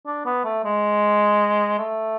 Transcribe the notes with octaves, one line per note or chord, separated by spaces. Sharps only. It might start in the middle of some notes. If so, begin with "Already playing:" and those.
D4
B3
A3
G#3
A3